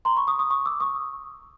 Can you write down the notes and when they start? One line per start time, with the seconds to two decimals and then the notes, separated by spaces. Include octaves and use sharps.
0.05 A#5 C6
0.17 B5 C#6
0.27 C#6 D#6
0.39 C#6 D#6
0.50 C#6 D#6
0.66 D6 E6
0.80 C#6 D#6